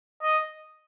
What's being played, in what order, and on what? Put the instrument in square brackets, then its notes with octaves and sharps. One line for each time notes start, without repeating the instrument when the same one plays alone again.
[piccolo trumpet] D#5